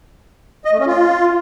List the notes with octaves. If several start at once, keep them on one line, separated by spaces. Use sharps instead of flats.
D#5
A3
C#4
F4